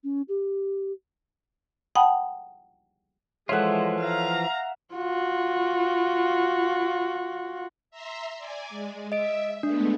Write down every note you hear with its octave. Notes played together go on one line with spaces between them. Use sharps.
C#4
G4
F#5 G5 A5 B5 D#6
E3 F3 G#3 F4 A4 C#5 E5 F#5
F5 A#5
F4 F#4
E5 A#5 C6
D5 G#5
G#3
D#5 E5 D7
G#3 A3 B3 D4